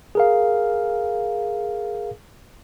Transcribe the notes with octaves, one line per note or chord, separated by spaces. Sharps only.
G#4 A#4 F5